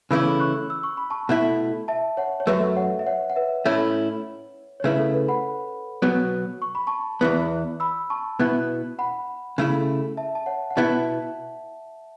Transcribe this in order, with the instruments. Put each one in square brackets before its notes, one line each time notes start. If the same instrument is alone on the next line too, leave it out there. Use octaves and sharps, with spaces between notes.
[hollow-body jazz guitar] C#3 E3 A3 C#4 E4 [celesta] B5 E6
[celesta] C#6 F#6
E6
C#6
B5
A5 C#6
[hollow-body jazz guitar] B2 A3 E4
[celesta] E5 A5
C#5 F#5
C#5
[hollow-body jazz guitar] F#2 F#3 A3 [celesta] B4 E5
[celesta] C#5 F#5
E5
C#5 F#5
F#5
B4 E5
[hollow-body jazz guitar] A2 A3 C#4 E4 [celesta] C#5
[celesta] C#5
[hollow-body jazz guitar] C#3 A3 E4 [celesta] B4
[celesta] A4
B4
F#5 B5
[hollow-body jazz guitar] B2 F#3 B3
[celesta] C#6
B5
A5 C#6
[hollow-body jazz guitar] E2 E3 B3
[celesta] B5 E6
A5 C#6
[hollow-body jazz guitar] B2 B3 E4
[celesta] F#5 B5
[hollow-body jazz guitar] C#3 A3 E4
[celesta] E5 A5
A5
C#5 F#5
F#5
[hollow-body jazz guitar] B2 B3 E4 [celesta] E5 A5